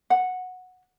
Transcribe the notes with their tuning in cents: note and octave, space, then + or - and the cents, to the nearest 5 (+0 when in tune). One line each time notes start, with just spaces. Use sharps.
F#5 -10